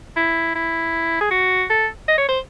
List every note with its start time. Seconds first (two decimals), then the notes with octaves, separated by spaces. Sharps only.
0.17 E4
0.55 E4
1.21 G#4
1.31 F#4
1.70 A4
2.08 D#5
2.18 C#5
2.28 C5